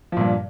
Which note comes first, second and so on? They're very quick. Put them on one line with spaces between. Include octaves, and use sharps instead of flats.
F3 A#2 G2